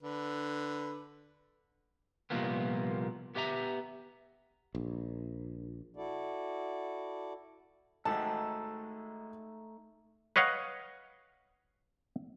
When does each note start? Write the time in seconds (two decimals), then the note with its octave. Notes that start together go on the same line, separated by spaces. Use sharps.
0.03 D3 B4
2.30 C2 F2 A#2 F3 A#3 B3
3.35 B3 G4 E5 A#5
4.75 A#1
5.96 E4 F#4 A4 D5
8.05 G#1 G#3 A3 D#4 A4 A5
10.36 B4 C#5 D#5 F5 F#5